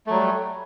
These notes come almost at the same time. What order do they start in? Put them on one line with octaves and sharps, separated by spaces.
A3 F#3 G3